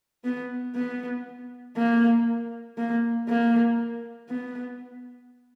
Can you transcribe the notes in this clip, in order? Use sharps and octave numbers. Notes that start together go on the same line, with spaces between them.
B3
B3
A#3
A#3
A#3
B3